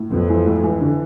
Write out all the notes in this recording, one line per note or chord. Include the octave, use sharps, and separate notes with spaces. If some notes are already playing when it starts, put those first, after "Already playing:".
Already playing: A2
F2 B3
E3
A2
E3
D3